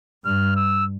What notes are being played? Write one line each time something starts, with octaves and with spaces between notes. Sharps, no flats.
G2 F6
E6